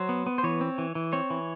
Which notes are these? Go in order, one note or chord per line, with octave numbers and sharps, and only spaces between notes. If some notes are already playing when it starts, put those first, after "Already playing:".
Already playing: F#3 C5
B3
B3
C5
E3 C#5
C4
E3
E3
C4 C#5
E3